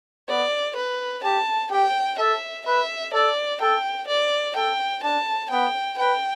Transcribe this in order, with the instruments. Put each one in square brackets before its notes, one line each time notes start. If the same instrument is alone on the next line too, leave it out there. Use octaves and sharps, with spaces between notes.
[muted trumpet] B3 [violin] D5
[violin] B4
[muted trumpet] G4 [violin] A5
[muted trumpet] G4 [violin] G5
[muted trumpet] A4 [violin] E5
[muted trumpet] B4 [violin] E5
[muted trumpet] A4 [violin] D5
[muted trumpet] A4 [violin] G5
[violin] D5
[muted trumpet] A4 [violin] G5
[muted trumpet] D4 [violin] A5
[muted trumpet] B3 [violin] G5
[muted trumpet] B4 [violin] G5